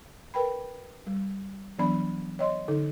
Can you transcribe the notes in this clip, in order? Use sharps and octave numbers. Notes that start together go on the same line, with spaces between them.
A#4 B4 G5 B5
G3
E3 F#3 B3 D4 D5 B5
C#5 D#5 C6
D3 D#4 A4